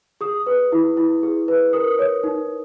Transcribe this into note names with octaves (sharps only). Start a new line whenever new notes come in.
G#4 D#6
B4
E4
E4
G#4
B4
A#4 D#6
C#5
D#4